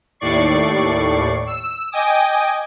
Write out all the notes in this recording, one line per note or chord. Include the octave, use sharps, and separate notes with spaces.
D#2 A2 D5 C#6 C7
E6
D#5 G5 G#5 D6 D#6